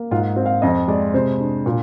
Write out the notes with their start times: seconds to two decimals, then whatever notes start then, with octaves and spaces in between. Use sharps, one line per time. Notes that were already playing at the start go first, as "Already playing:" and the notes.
Already playing: A#3
0.11 G#2 F4
0.36 C4
0.46 F5
0.62 F2 D#5
0.88 G#3 D5
1.14 C3 C5
1.40 D4
1.66 A#2